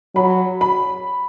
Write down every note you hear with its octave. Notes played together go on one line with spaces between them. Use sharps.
F#3 B5
B5